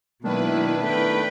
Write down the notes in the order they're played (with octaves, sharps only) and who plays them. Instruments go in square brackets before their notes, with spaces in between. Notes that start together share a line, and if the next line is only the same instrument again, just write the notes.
[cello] B2 [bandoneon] D#3 D4 [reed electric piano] F#3 G#3 A#3 [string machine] E4 B4
[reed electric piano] A3 B3 A4 [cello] B4 [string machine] G5